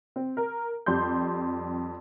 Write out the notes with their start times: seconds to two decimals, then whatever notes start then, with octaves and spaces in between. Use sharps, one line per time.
0.16 C4
0.37 A#4
0.86 F2 G3 C6 G6